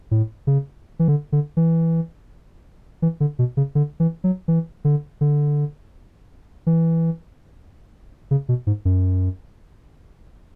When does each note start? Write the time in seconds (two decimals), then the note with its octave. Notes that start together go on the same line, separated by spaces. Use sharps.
0.11 A2
0.47 C#3
0.99 E3
1.08 D3
1.32 D3
1.57 E3
3.02 E3
3.20 D3
3.39 B2
3.57 C#3
3.75 D3
4.00 E3
4.24 F#3
4.48 E3
4.85 D3
5.21 D3
6.67 E3
8.31 C#3
8.49 B2
8.67 G#2
8.85 F#2